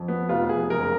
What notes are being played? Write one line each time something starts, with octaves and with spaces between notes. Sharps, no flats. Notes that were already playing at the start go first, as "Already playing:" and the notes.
Already playing: F2
B3
F1 F4
F1 G#4
F#1 A#4